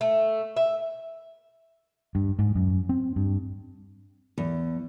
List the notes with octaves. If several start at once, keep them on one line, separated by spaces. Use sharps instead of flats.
A3
E5
G2
G#2
F#2
C4
G2
E2